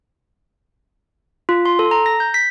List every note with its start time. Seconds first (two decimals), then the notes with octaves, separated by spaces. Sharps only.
1.49 F4
1.66 C6
1.79 A4
1.91 A#5
2.06 A#6
2.20 G6
2.34 B6